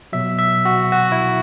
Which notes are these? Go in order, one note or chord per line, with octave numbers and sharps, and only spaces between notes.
B2 F#3 E5
E5
F#4
F#4
E4